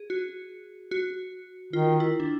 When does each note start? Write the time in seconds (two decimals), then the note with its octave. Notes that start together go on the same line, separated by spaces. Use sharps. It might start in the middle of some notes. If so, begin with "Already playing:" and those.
Already playing: G#4
0.10 F#4
0.91 F#4
1.73 D#3 F4
2.00 E4
2.20 D4